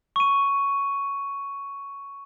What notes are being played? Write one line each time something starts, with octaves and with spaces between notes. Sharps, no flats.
C#6 D#7